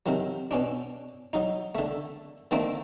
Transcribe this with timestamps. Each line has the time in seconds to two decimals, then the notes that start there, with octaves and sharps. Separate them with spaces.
0.06 C3 D#3 F#3
0.51 B2 C#4 D4
1.33 F#3 D#4
1.75 D3 A3
2.51 D3 D#3 A3 A#3 C4